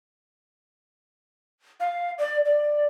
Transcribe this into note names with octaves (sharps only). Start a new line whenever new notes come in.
F5
D5
D5